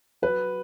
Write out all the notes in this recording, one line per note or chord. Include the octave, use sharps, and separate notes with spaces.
F#3 B4